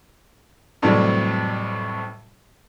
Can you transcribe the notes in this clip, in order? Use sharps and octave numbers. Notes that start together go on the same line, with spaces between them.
F2 A2 C3 E3 F#3 G3